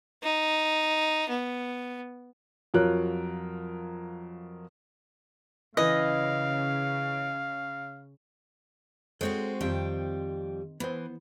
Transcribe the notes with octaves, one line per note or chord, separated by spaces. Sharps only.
D#4
B3
F2 F#3 F4 A#4 C#5 F#6
C#3 E3 B4 D#5 F5
G#3 C4 F#4 A4 C5 C#5
F2 D#3 G3 C4 G5
E3 B3 C5